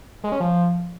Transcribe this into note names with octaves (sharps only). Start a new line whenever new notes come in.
G#3
C#4
F3